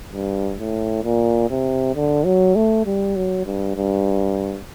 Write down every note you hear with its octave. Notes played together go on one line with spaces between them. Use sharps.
G2
A2
A#2
C3
D3
F#3
A3
G3
F#3
G2
G2